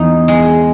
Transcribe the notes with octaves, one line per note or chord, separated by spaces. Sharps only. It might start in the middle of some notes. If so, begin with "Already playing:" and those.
Already playing: E2 D#4
G#3